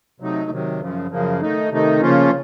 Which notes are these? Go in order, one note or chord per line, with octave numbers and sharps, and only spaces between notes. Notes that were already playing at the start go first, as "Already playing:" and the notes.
C3 F#3 A3 D#4
C3 D#3 F#3
F#2 C#3 F3
F#2 C#3 F3 A#3
D#3 A3 D#4
C3 D#3 A3 D#4
C#3 F3 A#3 C#4 F4